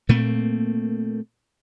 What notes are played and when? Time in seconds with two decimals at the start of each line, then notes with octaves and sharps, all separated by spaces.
0.09 A#2 A3 A#3 C4